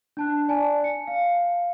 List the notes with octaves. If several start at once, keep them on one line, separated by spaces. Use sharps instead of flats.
D4 A5 F#6
D5 G#5 A5
C#7
F5